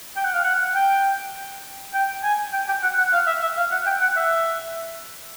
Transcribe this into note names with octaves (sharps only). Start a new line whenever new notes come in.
G5
F#5
F5
F#5
G5
G5
G#5
G5
G5
F#5
F#5
F5
E5
E5
F5
F#5
G5
F#5
E5